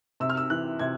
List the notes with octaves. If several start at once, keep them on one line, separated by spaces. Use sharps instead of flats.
C3 E6
F6
E6
E3 F#6
C3 G#6